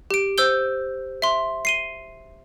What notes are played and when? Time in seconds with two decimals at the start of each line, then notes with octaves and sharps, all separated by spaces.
0.11 G4 D7
0.38 C5 E6 G6 G7
1.22 E5 C6
1.65 C7 D#7 G7